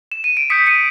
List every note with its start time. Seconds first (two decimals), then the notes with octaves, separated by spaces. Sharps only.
0.12 E7
0.24 D#7
0.37 D7
0.50 D#6 G6 B6 C#7
0.67 C#7 D#7